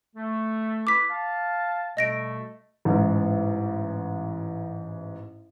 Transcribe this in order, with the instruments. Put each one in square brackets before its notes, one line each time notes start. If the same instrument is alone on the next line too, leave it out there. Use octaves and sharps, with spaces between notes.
[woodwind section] A3
[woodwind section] E4 B4 [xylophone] D6 B6
[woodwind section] F5 A5
[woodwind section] B2 G3 A3 [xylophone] D#5 A#6 D7
[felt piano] A1 G#2